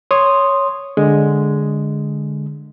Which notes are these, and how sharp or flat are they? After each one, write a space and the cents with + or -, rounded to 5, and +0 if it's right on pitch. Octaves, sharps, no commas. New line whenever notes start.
C#5 +0 C6 +0 D#6 -10
D3 +0 G#3 +0